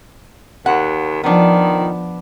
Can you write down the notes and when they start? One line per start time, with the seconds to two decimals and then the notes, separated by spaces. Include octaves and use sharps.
0.66 D#2 F#5
1.23 D#3 F3 B3 D4